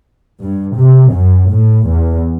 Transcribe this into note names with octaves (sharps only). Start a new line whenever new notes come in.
G2
C3
F#2
A2
E2